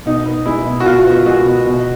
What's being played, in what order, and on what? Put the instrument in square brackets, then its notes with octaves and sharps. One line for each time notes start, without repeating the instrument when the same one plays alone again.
[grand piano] B2 D#4
B3
G#3 E4
B2
F#4
B2 F4
B3
G#3 F#4
B2
B2